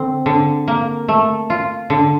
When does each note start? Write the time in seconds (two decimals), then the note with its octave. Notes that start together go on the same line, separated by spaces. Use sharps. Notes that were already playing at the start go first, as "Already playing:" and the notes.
Already playing: D3 C4
0.26 D3
0.68 A#3
1.08 A3
1.50 F4
1.90 D3